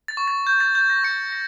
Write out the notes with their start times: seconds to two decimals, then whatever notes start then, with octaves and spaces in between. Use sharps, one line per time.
0.08 A6
0.17 C#6
0.28 A6
0.47 G6
0.60 A6
0.75 G6 A6
0.90 A#6
1.04 C#6 C#7
1.32 A#6